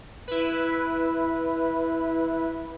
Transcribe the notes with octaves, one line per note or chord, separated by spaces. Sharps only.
E4 B4